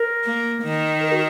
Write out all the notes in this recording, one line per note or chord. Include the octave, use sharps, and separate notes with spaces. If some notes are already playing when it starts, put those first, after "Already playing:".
Already playing: A#4
A#3
D#3
A#4
F#4